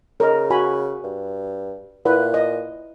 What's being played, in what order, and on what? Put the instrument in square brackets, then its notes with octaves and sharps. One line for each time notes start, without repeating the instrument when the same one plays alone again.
[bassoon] C#3 [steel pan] A#4 D#5
[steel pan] F#4 G#5 B5
[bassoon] G2
[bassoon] A#2 [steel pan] E4 B4 F#5
[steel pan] D#5